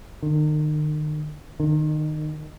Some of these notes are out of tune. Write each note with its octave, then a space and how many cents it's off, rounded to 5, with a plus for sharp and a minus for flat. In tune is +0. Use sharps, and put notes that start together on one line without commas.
D#3 -40
D#3 -25